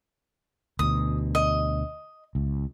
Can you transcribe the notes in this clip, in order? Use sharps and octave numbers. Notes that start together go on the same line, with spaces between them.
D2 B2 D#6
D#5
C#2